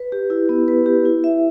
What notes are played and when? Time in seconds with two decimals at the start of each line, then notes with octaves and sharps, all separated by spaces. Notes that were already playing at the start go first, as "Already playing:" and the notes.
Already playing: B4
0.12 G4
0.30 E4
0.49 B3
0.68 B4
0.86 G4
1.05 E4
1.24 E5